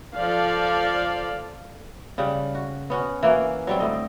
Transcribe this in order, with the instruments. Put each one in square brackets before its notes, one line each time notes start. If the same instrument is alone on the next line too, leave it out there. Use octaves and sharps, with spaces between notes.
[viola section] F3 A4 D5 F5
[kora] C#3 G3 F#5
F#4
B3 C#4 F#4
E3 A#3 F#4
F#3 G3 C4
A2 D3 D#5